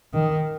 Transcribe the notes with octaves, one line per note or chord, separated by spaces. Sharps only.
D#3